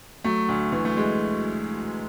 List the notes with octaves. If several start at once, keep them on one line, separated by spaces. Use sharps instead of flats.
F#3 A3
D2
E3 A3
A3
G#3